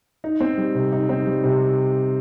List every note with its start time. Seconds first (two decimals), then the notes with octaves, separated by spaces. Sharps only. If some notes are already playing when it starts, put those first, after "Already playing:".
0.24 D#4
0.40 C4
0.58 G3
0.75 C3
0.92 D#4
1.09 C4
1.27 G3
1.44 C3